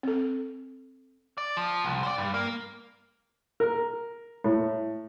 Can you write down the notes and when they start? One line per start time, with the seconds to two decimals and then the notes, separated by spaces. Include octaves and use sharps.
0.03 C4 A4
1.38 D5
1.57 F3
1.84 C2
2.03 C5 D5
2.18 G2
2.34 A#3
3.60 A#4
4.44 A2